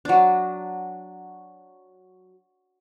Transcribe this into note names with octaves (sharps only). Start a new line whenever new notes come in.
F#3 D4